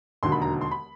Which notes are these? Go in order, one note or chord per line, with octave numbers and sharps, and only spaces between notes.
E1 D#2 D3 F#3 C6
B5
A#5
C6
B5